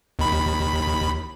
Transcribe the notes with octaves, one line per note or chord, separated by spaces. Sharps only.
D#2 B5